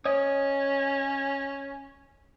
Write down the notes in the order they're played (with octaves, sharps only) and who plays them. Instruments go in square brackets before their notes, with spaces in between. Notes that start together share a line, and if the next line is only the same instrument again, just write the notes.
[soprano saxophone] C#4 [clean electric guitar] C#5 D#5